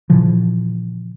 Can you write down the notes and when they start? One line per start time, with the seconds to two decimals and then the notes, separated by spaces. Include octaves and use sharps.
0.10 A#2 C#3 E3 F3